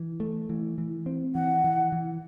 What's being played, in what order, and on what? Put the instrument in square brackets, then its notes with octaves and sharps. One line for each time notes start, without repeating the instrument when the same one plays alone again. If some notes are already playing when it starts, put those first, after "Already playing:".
Already playing: [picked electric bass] E3
A3
E3
E3
C4
[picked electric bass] E3 [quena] F#5
[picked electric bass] E3
E3